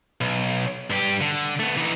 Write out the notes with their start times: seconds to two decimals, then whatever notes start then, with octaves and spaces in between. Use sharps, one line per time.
0.21 B1
0.90 G2 G4
1.21 D3
1.59 A3 B3
1.77 E3 D#4